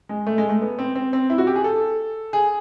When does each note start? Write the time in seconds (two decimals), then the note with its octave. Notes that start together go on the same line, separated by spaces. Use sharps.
0.09 G#3
0.27 A3
0.38 G#3
0.49 A3
0.62 B3
0.79 C4
0.95 C4
1.13 C4
1.30 E4
1.38 F#4
1.47 G4
1.56 G#4
1.64 A4
2.33 G#4